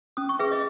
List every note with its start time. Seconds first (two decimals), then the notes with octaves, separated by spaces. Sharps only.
0.17 C#4 D#6
0.29 C#6
0.39 G#4 B4 E5
0.52 D#5